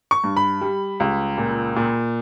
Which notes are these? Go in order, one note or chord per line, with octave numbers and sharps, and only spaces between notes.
C#6
G2
B5
G3
C#2
A#2
A#2